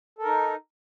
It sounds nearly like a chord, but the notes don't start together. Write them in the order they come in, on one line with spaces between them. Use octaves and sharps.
A4 A#4 D#4